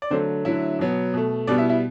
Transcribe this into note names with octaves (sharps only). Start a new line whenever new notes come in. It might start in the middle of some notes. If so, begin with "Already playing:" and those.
D5
D3 F#3 A3 C4 C5
D3 F#3 A3 E4 E5
B2 F#3 B3
B2 A3
B2 G3 B3 D4 D5
E4 E5
E4 E5